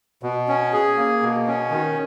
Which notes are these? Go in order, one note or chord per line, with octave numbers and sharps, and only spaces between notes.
B2
C#4
G#4
A#3
B2
C#4
D#3